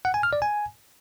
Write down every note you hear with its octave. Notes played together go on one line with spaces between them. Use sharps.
F#5
G#5
F6
D5
G#5